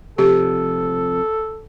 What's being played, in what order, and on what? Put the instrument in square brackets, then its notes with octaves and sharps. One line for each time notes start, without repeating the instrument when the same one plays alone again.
[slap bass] C3 F3 [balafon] G4 [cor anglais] A4